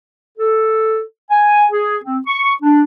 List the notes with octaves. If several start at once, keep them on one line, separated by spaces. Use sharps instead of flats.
A4
G#5
G#4
C4
C#6
D4